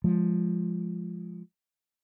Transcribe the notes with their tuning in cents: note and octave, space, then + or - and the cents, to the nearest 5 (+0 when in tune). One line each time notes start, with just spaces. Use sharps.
F3 +0 G#3 +0